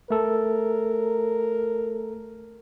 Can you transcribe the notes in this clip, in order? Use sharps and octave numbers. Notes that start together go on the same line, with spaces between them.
A3 A4 A#4